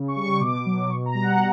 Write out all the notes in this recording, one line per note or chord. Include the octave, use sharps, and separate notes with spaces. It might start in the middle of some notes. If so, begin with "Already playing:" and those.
Already playing: C#3
C#6
G3
C#6
B2 D6
F#3
B2 C#6
A#5
G3
F#5